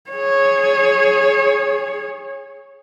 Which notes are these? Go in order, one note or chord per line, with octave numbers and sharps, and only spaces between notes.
G#4 C#5